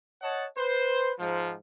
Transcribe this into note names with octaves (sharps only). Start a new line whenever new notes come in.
C#5 D#5 F#5 A5
B4 C5
G#2 F3